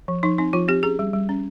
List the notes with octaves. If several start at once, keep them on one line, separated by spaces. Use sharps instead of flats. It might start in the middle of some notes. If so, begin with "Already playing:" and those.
F3
F3 D#4
C4 D#4
F3 F4
C4 G4
C#4 G#4
G3
G3
C#4